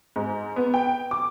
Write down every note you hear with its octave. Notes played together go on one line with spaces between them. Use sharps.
G#2
B3
G5
D6